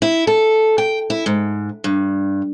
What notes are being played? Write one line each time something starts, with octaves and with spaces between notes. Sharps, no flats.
E4
A4
G5
E4
G#2
G2